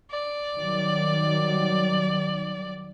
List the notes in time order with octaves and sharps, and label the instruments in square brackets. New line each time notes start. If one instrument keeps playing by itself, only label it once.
[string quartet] D5
[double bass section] D#3 F#3 G3